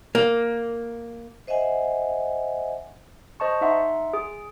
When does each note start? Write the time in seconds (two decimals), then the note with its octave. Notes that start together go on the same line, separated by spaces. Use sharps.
0.15 A#3
1.47 C5 D#5 E5 F#5 G#5
3.40 C5 D#5 A5 C#6
3.61 D#4 E5 F#5 C6
4.14 G#4